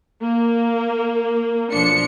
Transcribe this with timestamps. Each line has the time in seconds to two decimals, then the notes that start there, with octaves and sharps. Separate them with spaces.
0.19 A#3
1.73 B1 F3 D4 C#7